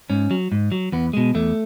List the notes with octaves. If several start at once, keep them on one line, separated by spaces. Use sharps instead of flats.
G#2 C#4
F#3
G#2
F#3
E2 B3
B2 G#3
E2 A3